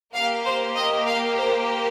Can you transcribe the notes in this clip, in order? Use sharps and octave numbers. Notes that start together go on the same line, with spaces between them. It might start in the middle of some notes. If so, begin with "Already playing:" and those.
A#3 G4 F5
C5
D#5
F5
C5